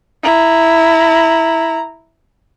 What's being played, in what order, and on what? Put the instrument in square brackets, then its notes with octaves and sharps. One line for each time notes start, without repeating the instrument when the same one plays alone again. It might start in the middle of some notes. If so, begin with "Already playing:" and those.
[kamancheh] E4 A#5